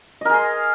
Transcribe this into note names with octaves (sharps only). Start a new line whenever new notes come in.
G#4 A#4 D#5 C6